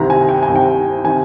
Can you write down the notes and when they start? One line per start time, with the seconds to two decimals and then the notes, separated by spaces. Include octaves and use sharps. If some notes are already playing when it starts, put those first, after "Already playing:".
Already playing: C2 C3 D#3 A#5
0.10 G#5
0.29 G5
0.43 G#5
0.48 C2 C3 D#3
0.55 G5
1.04 C3 D#3 G#5